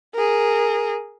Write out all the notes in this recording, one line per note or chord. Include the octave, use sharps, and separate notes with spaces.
G#4 A#4